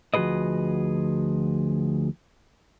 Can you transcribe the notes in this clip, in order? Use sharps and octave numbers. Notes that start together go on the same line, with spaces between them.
D2 F3 F#4 G#4 B4 D#5